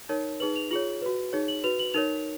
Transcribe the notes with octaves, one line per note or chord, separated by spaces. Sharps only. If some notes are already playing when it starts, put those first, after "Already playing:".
D#4 A#4 C#5
D#4 G#4 B4 F#7
F7
F4 G#4 C#5 F#7
F#4 B4
D#4 G#4 C#5
F#7
F#4 B4 F7
F#7
D#4 A#4 C#5 F7